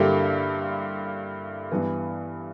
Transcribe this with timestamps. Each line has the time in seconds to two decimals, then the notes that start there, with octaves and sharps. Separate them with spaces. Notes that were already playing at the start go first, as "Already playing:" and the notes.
Already playing: G2 D3 A#3 E4 G4
1.71 G2 E3 B3